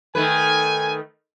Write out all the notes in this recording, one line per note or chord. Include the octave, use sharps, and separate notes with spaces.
D#3 A3 B4 G#5